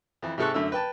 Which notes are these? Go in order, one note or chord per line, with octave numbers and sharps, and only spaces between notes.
F2 E3
G#2 C3 G#3 A4 C#6 F#6
F#2 D3 A3 E6
B4 G5 A5